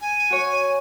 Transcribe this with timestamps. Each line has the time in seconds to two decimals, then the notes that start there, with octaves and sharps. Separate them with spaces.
0.01 G#5
0.30 F#4 C#5